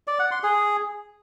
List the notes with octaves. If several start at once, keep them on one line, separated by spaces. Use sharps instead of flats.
D5
F#5
C6
G#4